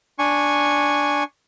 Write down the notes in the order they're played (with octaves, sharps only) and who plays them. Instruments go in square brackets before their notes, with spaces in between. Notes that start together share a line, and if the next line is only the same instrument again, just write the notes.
[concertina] D4 G#5 C#6